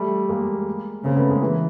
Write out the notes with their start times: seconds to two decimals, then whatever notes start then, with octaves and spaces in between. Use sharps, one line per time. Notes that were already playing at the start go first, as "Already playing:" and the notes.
Already playing: G3 A3
0.29 G#3 A#3
1.04 C#3 A#3 C4
1.17 A3 B3
1.29 G#3 A#3
1.42 E3